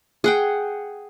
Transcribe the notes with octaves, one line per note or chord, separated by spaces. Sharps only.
G#4 F#5 G5